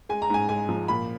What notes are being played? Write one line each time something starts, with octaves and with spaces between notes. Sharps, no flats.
G#3 G#5
A#5
G#2 G#5
G#3 G#5
F3
A#2 B5